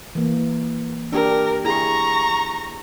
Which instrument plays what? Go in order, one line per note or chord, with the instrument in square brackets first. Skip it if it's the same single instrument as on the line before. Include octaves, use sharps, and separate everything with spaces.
[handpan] E3 A#3
[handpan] D4 G4 [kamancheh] A#4
[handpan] E4 G#4 [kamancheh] A#5 C#6